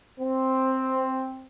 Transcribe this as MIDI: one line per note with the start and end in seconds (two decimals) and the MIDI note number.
0.20 1.47 60